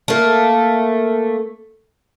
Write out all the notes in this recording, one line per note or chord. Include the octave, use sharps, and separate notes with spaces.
A3 A#3